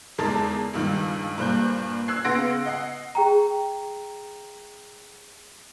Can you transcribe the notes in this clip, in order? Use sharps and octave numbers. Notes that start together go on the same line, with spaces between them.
E2 G#3 D#4 A#4 A5 A6
C#2 G2 D#3
G2 A#2 C5 F#6 G6
E6 F#6 G#6 C7
C#3 B3 F#5 C6 A#6 D7
D#5 F#5 C7
G#4 G5 A#5